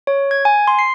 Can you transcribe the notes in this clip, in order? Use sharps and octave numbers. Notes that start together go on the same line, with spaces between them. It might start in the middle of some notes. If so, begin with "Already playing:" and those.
C#5
G#6
G#5
C6
C7